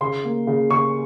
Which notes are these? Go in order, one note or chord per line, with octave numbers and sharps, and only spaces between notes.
C#3 C6
A#3
C#3
C#3 C#6